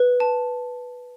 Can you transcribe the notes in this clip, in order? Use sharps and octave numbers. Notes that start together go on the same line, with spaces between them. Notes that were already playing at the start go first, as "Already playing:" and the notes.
Already playing: B4
A5